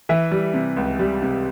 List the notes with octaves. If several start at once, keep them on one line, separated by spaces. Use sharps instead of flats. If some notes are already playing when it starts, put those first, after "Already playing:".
E3 E5
G3
C3
C#2
G3
C3